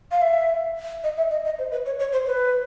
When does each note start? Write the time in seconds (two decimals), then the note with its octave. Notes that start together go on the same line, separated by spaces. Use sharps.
0.11 F5
0.22 E5
1.04 D#5
1.17 E5
1.31 D#5
1.45 D#5
1.59 C5
1.71 B4
1.86 C#5
1.99 C#5
2.12 C5
2.26 B4